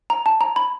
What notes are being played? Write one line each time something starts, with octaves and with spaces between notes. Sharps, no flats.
A#5
A5
A#5
B5